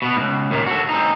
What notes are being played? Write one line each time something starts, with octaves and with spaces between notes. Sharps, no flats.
B2 B3
C#2 G#2
D#2 A#2
F#4 A4
C4 D#4